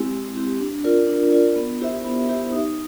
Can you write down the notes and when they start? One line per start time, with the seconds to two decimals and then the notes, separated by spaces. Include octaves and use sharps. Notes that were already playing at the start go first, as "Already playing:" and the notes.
Already playing: G#3 C4 E4 G4
0.11 G#3
0.36 C4 E4 G4
0.60 D4
0.84 F4 A#4 D5
1.07 D4
1.32 F4 A#4 D5
1.56 B3
1.81 E4 G4 C5 E5
2.04 B3
2.28 E4 G4 C5 E5
2.53 D#4